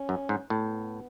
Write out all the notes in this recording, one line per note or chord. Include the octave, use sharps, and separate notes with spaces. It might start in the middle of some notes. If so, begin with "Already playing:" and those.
Already playing: C#4
F#2
G#2
A2 B3